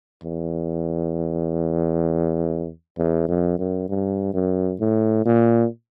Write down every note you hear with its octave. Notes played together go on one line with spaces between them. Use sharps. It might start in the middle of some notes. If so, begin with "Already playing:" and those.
E2
E2
F2
F#2
G2
F#2
A2
A#2